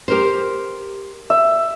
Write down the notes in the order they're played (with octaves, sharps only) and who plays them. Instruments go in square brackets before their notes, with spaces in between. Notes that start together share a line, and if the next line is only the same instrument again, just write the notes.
[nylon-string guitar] G4 A#4 C5
[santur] E5